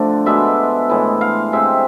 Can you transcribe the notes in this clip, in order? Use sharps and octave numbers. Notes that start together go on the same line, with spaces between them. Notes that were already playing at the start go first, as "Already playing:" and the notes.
Already playing: D3 F3 A3 D4
B2 G#3 D4 E5
A2 E3 G#3
F5
C3 G#3 C4 E5